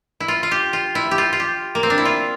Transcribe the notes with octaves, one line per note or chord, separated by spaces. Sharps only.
E4
F4
F4
G4
F4
E4
G4
F4
F4
G4
A#3
C4
D4
E4
F4